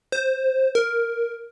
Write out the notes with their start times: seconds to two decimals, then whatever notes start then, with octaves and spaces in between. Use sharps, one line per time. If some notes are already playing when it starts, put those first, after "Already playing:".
0.12 C5
0.75 A#4